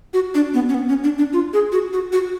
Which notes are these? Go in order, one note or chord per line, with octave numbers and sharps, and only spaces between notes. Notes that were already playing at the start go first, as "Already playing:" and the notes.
F#4
D4
B3
C#4
B3
C#4
D4
D4
F4
G#4
F#4
F#4
F#4